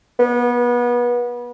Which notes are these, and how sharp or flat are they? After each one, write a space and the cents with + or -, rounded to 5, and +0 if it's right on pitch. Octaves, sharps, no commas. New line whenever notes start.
B3 -30